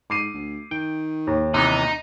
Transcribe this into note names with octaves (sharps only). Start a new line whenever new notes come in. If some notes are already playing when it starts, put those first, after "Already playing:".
G#2 D6 C7 D#7
D2
D#3 G5
D#2
C3 E3 B3 D#4